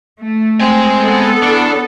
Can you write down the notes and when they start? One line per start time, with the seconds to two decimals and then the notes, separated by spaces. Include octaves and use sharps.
0.20 A3
0.61 G#3 C4 G#5
0.99 B3 A4
1.42 E2 D4